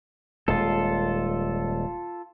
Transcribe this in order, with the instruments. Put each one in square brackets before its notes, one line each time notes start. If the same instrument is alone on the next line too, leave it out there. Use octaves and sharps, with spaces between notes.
[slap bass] D#1 G#3 [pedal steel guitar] F4 A4